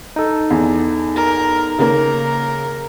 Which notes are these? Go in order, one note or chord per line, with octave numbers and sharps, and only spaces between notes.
D#4 A4
E2
A#4
C#3 A#3 A#4